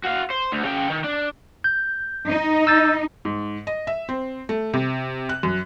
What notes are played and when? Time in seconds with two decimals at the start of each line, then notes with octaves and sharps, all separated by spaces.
0.05 F#4 F5
0.31 C5
0.52 D2
0.65 C#3 G5
0.90 D#3
1.04 D4
1.64 G6
2.28 D#4
2.67 E6 G6 A6
3.25 G#2
3.67 D#5
3.87 E5
4.09 C4
4.49 A3
4.74 C3
5.29 F#6
5.43 F#2